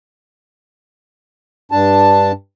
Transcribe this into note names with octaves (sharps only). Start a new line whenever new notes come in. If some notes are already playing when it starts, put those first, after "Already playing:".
G2 D4 A5